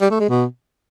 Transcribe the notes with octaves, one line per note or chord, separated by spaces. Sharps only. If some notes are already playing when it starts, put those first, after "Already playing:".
G3
A3
G#3
B2